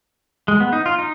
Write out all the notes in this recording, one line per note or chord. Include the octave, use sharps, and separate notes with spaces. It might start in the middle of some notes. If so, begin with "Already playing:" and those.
G#3
B3
D#4
F4
D#4